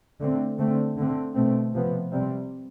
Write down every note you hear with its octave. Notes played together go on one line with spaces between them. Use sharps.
D3 A3 C4
D3 A3 C4
D3 A3 C4
B2 A3 C4
C3 F3 B3
C3 G3 C4